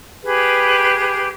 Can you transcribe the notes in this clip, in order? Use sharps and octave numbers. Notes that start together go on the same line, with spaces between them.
G4 G#4 B4